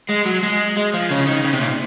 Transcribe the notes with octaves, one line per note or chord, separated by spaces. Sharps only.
G#3
F#3
G#3
G#3
F3
C#3
D#3
C#3
C3
A#2